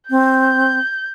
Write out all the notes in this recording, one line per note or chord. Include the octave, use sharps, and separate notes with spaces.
C4 G6